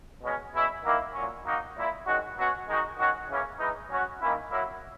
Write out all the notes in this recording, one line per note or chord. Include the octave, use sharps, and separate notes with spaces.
B2 G#3 C#4
B2 G#3 C#4 E4
D#3 F#3 A#3 E4
A#2 F#3 C#4
D#3 F#3 A#3 D#4 F#4
A#2 A#3 E4
D#3 G#3 C#4 F#4
B2 F#3 C#4 F#4
D#3 G#3 D#4 F#4
D#3 F#3 C#4 F#4
C#3 E3 A#3 C#4
E3 G#3 D#4
F#3 C#4 F#4
D#3 A#3 C#4 E4
F#3 A#3 E4